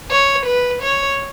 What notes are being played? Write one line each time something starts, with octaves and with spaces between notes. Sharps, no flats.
C#5
B4
C#5